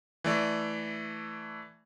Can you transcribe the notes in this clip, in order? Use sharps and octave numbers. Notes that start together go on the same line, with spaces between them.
E3 A3 D5